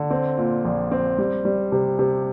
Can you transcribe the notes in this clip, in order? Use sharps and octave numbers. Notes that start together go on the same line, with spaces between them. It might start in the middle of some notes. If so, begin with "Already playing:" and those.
Already playing: D3
C4
A#2
A#1
C4
G3
G3
C3
C3